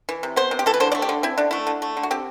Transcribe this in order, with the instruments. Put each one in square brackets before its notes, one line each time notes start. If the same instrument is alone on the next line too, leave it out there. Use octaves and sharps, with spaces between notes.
[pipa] E3
C3
B3 C5
C3
G4
E3 A4
B4
D3 C5
D5
A3
G4
D3
C4 E4
D3 D4
A3 E4
D3
A3
D3
F#4
C4 G4